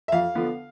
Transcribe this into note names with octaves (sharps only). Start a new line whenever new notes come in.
E5
F2 F5
D3 F3 B3